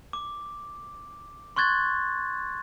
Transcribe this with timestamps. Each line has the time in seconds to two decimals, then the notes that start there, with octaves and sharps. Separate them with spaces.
0.13 D6
1.56 C6 C#6 F#6 G#6 A6